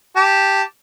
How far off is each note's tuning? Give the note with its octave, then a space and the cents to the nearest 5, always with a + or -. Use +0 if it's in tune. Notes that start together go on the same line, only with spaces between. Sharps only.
G4 +0 A5 +0